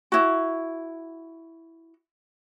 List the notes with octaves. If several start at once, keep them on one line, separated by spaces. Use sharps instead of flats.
E4 F#4